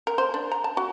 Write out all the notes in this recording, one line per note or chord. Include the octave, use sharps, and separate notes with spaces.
A#4
C5
D4
A#5
A5
F#4